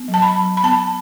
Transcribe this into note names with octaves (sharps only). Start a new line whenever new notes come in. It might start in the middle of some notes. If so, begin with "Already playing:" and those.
Already playing: B3
F#3
A5
B5
F#3
B5
B3 A5